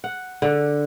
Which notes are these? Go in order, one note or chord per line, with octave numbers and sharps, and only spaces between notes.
F#5
D3